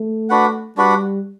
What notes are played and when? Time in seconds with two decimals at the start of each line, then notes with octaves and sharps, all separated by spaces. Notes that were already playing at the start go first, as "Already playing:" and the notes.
Already playing: A3
0.30 D4 F#4 B4 F#5
0.77 G3 D4 F#4 B4 F#5